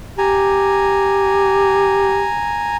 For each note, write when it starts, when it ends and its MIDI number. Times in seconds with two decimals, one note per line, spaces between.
0.18 2.29 67
0.18 2.77 80
0.18 2.77 82